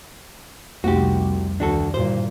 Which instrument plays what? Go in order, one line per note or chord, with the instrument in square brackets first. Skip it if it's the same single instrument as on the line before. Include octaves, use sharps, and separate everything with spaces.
[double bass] C2 C3 [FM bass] F2 [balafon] A3 A#3 D#4 [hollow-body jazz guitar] F#4 G4
[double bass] D2 [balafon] D#3 [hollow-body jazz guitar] D4 F#4 A4
[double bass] G2 A#2 [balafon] D3 E4 F#4 [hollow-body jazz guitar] C5